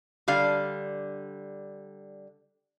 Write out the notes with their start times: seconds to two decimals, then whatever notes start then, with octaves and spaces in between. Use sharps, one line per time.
0.28 D3 G3 F5